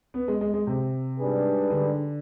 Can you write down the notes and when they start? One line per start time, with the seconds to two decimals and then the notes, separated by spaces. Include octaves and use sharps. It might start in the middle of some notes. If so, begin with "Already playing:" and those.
0.14 B3
0.28 G#3
0.41 G#3
0.54 G#3
0.67 C3
1.19 G#2 G3 D4 G#4 B4
1.70 D3